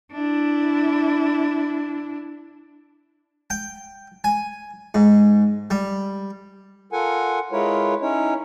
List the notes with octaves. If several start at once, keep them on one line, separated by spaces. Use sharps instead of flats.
D4 E4
G5
G#5
G#2
G3
F4 A4 A#4 F#5 G#5
G#3 E4 F4 A#4 B4 C#5
C#4 D#4 E4 C#5